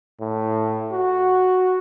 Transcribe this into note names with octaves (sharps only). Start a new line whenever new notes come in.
A2
F#4